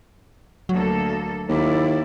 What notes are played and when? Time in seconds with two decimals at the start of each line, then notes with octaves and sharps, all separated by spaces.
0.69 D2 F#3 A#3 A4
1.49 D#2 A#3 E4 D5